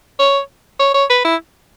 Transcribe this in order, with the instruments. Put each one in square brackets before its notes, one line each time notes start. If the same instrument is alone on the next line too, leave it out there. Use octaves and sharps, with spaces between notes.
[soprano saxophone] C#5
C#5
C#5
B4
E4